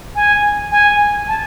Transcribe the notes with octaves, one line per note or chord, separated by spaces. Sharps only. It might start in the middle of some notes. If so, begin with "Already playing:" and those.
G#5
G#5
A5